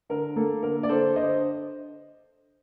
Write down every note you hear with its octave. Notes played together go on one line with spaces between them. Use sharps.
D3 A#4
A#3 A4
D3 A#4
D5
D3 A4 C5
D3 C5 D#5